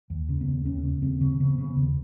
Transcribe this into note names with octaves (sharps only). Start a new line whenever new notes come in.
D#2
C#3
B3
D#2
D#2 C#4
C#3
D#2 C4
C#3
C#3 B3
C#3
B3
D#2